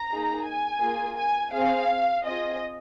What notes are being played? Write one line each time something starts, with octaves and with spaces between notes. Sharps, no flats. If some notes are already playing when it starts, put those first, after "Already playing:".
Already playing: A#5
A#3 D#4 G#4
G#5
A#3 F4 G#4
G#5
C4 G#4 F5
C4 F4 G#4 D#5